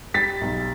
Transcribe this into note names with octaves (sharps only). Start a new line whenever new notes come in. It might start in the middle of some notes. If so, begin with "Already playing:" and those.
G3 A6 B6
B1